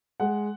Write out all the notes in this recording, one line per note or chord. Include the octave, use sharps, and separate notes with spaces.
G#3 F#5